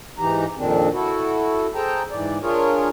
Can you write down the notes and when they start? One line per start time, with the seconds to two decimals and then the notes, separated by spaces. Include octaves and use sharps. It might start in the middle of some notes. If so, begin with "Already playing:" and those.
0.18 G#2 E3 D#4 G4 A#5
0.56 F2 A#2 D#3 C4 D4
0.93 E4 F#4 A4
1.75 G#4 A4 C5 G5 A5 A#5
2.11 G#2 E3 D5
2.42 D4 F4 G#4 A#4 C#5